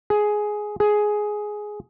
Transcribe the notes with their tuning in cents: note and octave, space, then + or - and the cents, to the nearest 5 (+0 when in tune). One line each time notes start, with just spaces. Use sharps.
G#4 +10
G#4 +10